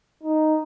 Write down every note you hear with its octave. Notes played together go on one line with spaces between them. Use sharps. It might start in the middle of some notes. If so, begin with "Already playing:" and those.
D#4